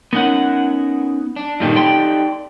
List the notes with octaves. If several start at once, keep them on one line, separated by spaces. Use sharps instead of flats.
B3 C#4 D#4 A#4 F#5
D4
G2 A#2 D#3 D#4 G4 A4
D5 G5 C6